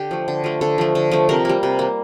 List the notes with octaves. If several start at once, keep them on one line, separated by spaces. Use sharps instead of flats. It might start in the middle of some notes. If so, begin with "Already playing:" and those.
Already playing: D3 G4
F3 A3
D3
F3 A3
D3 A4
F3 A3
D3
F3 A3
C3 A#4
G3 A#3
C3
G3 A#3